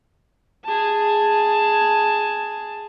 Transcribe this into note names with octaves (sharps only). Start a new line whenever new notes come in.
G#4 A5